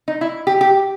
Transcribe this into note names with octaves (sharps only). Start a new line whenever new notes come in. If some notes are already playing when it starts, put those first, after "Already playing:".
D#4
E4
G4
G4